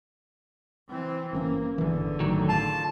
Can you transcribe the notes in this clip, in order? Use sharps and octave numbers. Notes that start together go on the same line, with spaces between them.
E3 C4
G1 E3 A#3 C#4
G1 E2 D3 E3
A2 D#3 F#3
F4 A5